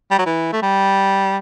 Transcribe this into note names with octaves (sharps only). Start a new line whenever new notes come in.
G3
F#3
E3
A3
G3